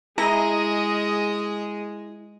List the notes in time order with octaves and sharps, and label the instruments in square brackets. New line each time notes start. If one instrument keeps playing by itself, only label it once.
[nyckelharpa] G#3 [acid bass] E4 [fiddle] G#4 D#5 [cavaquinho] A#5